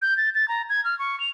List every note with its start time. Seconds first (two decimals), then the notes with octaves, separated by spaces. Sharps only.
0.02 G6
0.17 A6
0.35 A6
0.48 A#5
0.69 G#6
0.84 F6
0.99 C#6
1.20 F7